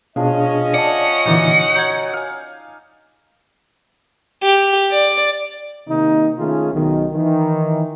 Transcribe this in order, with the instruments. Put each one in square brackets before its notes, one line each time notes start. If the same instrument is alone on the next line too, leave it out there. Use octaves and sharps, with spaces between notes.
[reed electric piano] B2 D4 G#4 [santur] F3 [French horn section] C#4 D#5
[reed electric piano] D5 A5 [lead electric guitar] F#5 [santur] D#6
[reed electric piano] A#2 D3 E3 [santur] D#4 F#4 D5
[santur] F#3 [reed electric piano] G6 G#6
[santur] F5 G#5
[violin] G4
D5
[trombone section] C3 D#3 A#3 D#4
D#3 A3 C#4 F4 G#4
B1 B2 D#3
D#3 E3